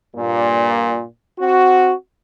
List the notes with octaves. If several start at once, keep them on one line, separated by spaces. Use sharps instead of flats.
G2 A#2
C4 F#4